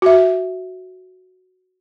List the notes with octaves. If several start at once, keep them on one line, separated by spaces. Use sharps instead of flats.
F#4 E5